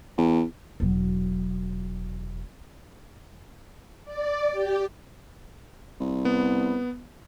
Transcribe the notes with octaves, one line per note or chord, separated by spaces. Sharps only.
E2
E1 F#3
D5
G4
C2
B3